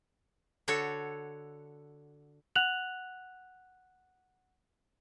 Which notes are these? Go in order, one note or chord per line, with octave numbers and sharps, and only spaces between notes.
D3 F#4 A4 C#5
F#5 F#6 F7 F#7